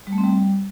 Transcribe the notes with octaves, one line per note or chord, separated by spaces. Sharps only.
G3
A3
C4
G3